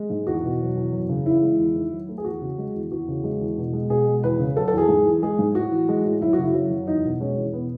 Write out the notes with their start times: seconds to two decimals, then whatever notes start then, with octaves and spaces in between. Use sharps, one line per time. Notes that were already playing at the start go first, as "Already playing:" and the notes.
Already playing: G#3
0.10 G#2
0.27 E2 F#4
0.43 B2
0.60 F#3
0.76 E2
0.92 F#2
1.09 C#3
1.26 E3 E4
1.43 G#3
1.59 E2
1.75 D#3
1.91 F#3
2.09 A3
2.18 G#4
2.24 E2 F#4
2.42 C#3
2.58 G#3
2.75 E2
2.91 E2 F#4
3.08 C#3
3.24 G#3
3.41 E2
3.58 B2
3.73 G#3
3.90 B2 G#4
4.07 G#3
4.23 E2 B4
4.40 C#3
4.56 F#3 A4
4.68 A4
4.73 E2 G#4
4.89 G#2
5.05 E3
5.22 G#3 G#4
5.39 G#2
5.55 A2 F#4
5.71 E3
5.89 G#3
6.05 A2
6.21 F#2 E4
6.33 C#3 F#4
6.44 E4
6.54 F#3
6.71 F#2
6.87 E2 D#4
7.05 B2
7.21 G#3 C#4
7.38 E2
7.53 B2 B3